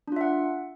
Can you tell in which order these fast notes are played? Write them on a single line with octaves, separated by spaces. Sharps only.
D4 F4 E5 F#5